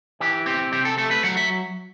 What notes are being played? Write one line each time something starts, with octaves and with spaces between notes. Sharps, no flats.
E3 G4
C4 G4
C3 G4
A4
A3 A4
B4
F#3 F#5
E5